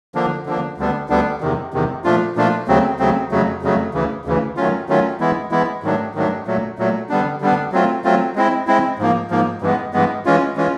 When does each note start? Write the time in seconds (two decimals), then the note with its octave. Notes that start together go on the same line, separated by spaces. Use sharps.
0.15 D3 F3 A#3 D4
0.46 D3 F3 A#3 D4
0.78 D2 D3 G3 B3 D4
1.09 D2 D3 G3 B3 D4
1.41 E2 C3 D#3
1.73 E2 C3 D#3
2.04 A#2 F3 A3 D4 F4
2.36 A#2 F3 A3 D4 F4
2.68 D#2 C#3 F#3 A3 C4
2.99 D#2 C#3 F#3 A3 C4
3.31 F2 C#3 F#3 A3
3.62 F2 C#3 F#3 A3
3.94 D2 C#3 E3
4.25 D2 C#3 E3
4.57 D#3 F#3 A3 C#4 F4
4.89 D#3 F#3 A3 C#4 F4
5.20 E3 G#3 B3 E4
5.51 E3 G#3 B3 E4
5.83 G#2 D#3 F#3 A3 D4
6.15 G#2 D#3 F#3 A3 D4
6.46 A#2 F#3 A3
6.78 A#2 F#3 A3
7.09 D3 G3 B3 D4
7.41 D3 G3 B3 D4
7.72 F#3 A3 C4 F4
8.04 F#3 A3 C4 F4
8.36 G#3 C4 E4
8.67 G#3 C4 E4
8.99 G#2 F3 A#3
9.30 G#2 F3 A#3
9.62 G2 E3 G#3 B3
9.93 G2 E3 G#3 B3
10.25 E3 G#3 C#4 F4
10.56 E3 G#3 C#4 F4